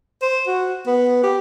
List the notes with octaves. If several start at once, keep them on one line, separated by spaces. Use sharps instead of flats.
C5
F#4
B3
G4